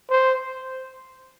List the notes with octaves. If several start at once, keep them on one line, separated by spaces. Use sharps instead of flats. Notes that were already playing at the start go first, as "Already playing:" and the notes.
C5